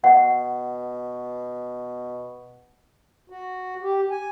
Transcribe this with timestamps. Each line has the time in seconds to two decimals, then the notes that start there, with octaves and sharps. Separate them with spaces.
0.04 B2 F#5
3.30 F#4
3.82 G4
4.11 G#5